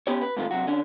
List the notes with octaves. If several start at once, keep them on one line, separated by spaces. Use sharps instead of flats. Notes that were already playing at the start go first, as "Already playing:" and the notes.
B3 C#4 G4 C#5
B4
G#2 C3 D#3 F3 A3 F4
C3 F#3 F#4
D3 C#4 D4